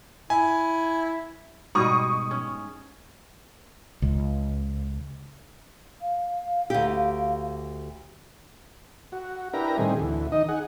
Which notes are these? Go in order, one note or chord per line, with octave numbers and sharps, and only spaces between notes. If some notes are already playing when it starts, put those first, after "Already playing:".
E4 G#5
G#2 B2 G3 C#6 D#6
C#4
C#2
F5
D2 G4
F#4
D4 E4 G4 A#4 B4 A#5
A2 D#3 G3 C4 G#4
D2 E3
D#3 D#4 D#5
D#4 G#4 F#5